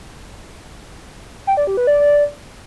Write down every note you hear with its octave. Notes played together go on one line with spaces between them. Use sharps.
G5
D5
G4
B4
D5